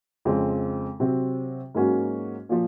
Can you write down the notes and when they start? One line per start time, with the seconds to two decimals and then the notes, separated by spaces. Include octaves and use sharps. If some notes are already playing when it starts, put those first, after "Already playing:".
0.25 F2 C#3 G#3 C4
1.00 C3 F#3 C4 F#4
1.75 G#2 F#3 A#3 C#4 F#4
2.49 A#2 F3